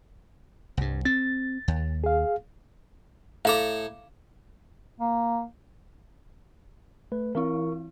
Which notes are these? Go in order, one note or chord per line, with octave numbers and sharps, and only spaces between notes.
C2 G2
C4 A6
D#2
G#4 F5
A2 A4 F5 A#5 D6
A#3
A3 B4
E3 C4 E4 A#4 C#6